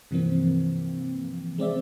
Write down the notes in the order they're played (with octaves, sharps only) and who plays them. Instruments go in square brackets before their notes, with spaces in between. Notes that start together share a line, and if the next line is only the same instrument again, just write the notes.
[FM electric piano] G2 C3 E3 F3 A#3 C4
G#3 C4 D5 E5